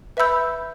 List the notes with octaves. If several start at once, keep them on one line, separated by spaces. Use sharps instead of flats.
B4 E5 B5 E6 G6